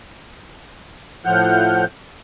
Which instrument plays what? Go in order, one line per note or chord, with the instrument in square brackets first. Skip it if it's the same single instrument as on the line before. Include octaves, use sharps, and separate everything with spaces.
[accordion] A2 F3 F#5 F6 G6